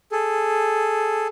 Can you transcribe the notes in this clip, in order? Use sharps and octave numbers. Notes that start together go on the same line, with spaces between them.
G#4 A4